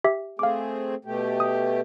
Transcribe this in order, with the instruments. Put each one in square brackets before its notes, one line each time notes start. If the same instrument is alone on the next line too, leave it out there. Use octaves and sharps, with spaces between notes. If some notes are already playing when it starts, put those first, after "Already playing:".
[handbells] G4 E5
[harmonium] A3 C4 G#4 [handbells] F5 D6
[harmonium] B2 A3 G4
[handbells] D#6